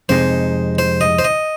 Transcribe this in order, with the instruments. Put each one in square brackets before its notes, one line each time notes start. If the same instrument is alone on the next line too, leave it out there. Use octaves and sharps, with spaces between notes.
[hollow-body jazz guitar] F2 C3 G#3 C4 D#4 [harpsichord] C5
[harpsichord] C5
D#5
C5
D#5